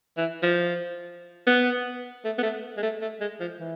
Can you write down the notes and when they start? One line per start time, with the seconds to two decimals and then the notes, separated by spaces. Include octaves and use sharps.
0.17 E3
0.43 F3
1.47 B3
2.24 A3
2.38 B3
2.43 A3
2.77 G#3
2.82 A3
3.01 A3
3.20 G#3
3.40 F3
3.60 E3